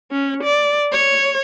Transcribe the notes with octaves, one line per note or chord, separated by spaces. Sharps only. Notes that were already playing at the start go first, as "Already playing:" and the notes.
C#4
D5
C#5